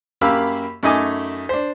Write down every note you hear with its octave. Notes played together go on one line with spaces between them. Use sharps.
F#2 A#3 G4 F5 B5 E6
F#2 A3 D#4 D#5 G#5 D6
D4 C5